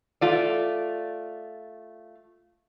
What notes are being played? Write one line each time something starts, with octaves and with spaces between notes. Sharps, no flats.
A3 F4 D5